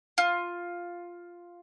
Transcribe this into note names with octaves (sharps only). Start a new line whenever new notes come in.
F4